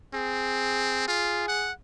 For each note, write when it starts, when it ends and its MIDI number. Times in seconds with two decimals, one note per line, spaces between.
0.14 1.03 60
0.14 1.07 68
1.08 1.45 65
1.08 1.70 68
1.48 1.72 78